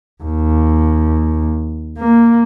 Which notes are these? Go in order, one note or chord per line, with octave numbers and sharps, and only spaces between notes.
D#2
A#3